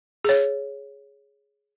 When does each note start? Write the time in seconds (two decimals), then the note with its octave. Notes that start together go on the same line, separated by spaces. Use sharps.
0.25 G#4 C#5